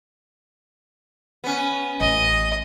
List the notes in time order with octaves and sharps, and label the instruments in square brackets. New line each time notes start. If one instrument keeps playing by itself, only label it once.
[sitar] B3 C#4
[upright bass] A1 [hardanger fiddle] D#5